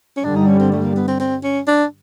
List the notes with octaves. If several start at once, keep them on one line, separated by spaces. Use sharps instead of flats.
C#4
G2 D3 G3 D4
D#4
C#4
C4
A3
A#3
B3
C4
C4
C#4
D4